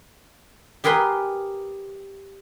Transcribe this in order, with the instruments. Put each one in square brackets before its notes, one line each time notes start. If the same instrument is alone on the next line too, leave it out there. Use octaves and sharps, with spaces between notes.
[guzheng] G4 G#4 A#4 B4 C6